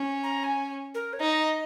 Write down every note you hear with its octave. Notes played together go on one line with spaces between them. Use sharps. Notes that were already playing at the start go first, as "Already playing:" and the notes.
Already playing: C#4
A#5
G#5
A#4
C#5
D#4 D#5